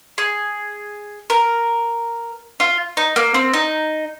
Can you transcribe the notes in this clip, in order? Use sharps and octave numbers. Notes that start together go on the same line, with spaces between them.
G#4
A#4
F4
D#4
A#3
C4
D#4